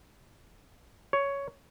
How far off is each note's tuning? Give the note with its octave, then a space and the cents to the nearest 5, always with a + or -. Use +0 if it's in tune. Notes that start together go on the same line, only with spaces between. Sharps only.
C#5 +10